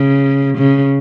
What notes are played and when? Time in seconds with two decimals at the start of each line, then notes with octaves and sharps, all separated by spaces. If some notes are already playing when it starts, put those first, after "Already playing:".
Already playing: C#3
0.58 C#3